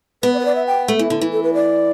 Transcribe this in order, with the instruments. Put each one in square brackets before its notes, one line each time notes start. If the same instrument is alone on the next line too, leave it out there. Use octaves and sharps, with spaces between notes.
[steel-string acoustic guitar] B3 [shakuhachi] B4
[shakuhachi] D5
B4
D5
E5
G5
[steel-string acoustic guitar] A3
E3
D3
E3
[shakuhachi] A4
B4
D5